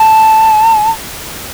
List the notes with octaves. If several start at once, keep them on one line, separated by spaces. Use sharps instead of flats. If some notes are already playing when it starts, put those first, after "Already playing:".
Already playing: A5